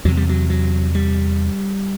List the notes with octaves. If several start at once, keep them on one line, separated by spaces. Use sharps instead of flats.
E2 C3 F#3
G3
F#3
F#3
G3